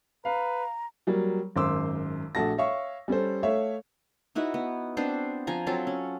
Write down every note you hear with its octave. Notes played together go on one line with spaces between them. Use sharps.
B4 F5 A#5
F#3 G3 A#3
G#1 F#2 C5 C6 D6 E6
A#1 A3 F#4 A5 A#6
C#5 E5 F5 C#6
G3 C#4 A4 C5
A3 C#5 E5 F5
D#4 E4 F#4 B4
B3
B3 C4 D4 C5
F3 G#5 A#5
F#3 C4 F4 A4
C#4